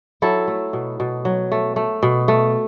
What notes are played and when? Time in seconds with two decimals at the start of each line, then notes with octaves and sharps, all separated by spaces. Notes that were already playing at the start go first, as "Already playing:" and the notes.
0.22 F#3 E4 A4
0.48 A3
0.73 B2
1.00 B2
1.25 F#3
1.52 A3
1.76 A3
2.03 B2
2.28 A3